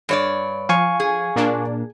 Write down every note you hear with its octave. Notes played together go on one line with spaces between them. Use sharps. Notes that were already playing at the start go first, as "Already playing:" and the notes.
G2 C#5 D5
F3 F5 G#5 C#6
G#4
A#2 A#3 D4